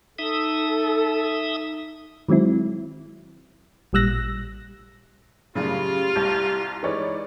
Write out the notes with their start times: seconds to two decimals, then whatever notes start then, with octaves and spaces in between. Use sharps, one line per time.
0.19 D#4 A4 E5 D#6
2.29 D#3 F#3 G#3 C4 E4
3.93 A1 A#2 G3 E6 F#6 A#6
5.55 F#2 A2 C#3 G3 F4 G4
6.16 C2 A5 C#6 G6
6.83 E3 G#3 D#4 B4 C#5 D5